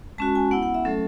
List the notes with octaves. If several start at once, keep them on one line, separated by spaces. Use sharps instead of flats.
G#3 C#4 F#4 A5
G#5
B3 E4 F#5
F#5
E5
F#3 A3 C#4 A4